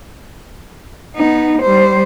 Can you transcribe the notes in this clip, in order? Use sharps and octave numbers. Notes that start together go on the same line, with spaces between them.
B3 D#4
G3 C5